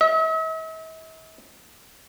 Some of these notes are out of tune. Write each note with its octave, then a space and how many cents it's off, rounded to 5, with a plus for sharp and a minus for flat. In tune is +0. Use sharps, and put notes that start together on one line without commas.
E5 -45